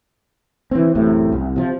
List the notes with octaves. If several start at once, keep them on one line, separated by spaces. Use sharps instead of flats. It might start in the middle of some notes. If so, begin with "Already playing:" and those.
E3 C4
A1 F#2 A2 C3
C2
C3 F3